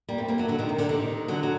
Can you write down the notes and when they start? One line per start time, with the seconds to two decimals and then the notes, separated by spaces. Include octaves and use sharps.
0.09 G3 A#3
0.18 A3 C4
0.28 G3 A#3
0.38 F#3 A3
0.48 D3 F#3
0.58 C3 D#3
0.69 C3
0.78 D3
0.89 C3 D#3
1.28 D3 F#3
1.43 F#3